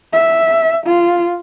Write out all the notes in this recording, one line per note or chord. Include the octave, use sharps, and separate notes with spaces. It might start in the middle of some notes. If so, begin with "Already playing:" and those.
E5
F4